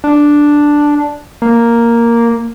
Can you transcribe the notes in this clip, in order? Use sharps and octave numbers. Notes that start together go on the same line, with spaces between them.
D4
A#3